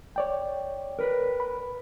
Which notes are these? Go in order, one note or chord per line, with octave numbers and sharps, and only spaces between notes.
C#5 D5 G5
A#4 B4
B5